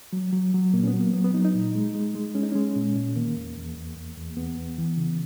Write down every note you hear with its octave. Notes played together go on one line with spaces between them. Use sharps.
F#3
F#3
F#3
A#2 A#3
C#4
B3
F#3
A#3
F#3 B3
B3
F#3 D#4
D#4
A#2
G#3
G#3
G#3
G#3 C#4
D#4
G#3 C#4
A#2
A#2
D#3 A#3
E2
E2
E2
E2
E2
E2 B3
E2
E3
C#3